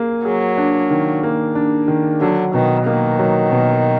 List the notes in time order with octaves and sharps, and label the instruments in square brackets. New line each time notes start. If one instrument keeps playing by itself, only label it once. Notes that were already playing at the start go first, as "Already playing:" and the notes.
Already playing: [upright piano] A#3 G#4
[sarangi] F#3 [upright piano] G#4
[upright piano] D4
D#3
A#3
D4
D#3
[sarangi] D3 [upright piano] F#3
[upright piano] B2 [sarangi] D#3
[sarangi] D#3 [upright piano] A#3
[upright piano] F#3
B2